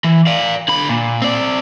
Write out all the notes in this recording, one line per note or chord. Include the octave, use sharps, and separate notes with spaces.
E3
D5 F5
D3 B5
A#2
C4 D5